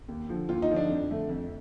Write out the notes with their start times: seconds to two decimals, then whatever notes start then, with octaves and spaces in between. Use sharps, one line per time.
0.08 D#2
0.29 D3 F3
0.49 D#2 F4
0.62 D#4
0.70 D3 F3
0.76 D4
0.89 F2
1.10 D3 A3
1.29 F2